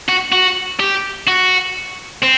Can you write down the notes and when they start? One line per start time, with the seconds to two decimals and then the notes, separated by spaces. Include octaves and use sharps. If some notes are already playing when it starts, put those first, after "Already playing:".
0.08 F#4
0.32 F#4
0.80 G4
1.27 F#4
2.22 C4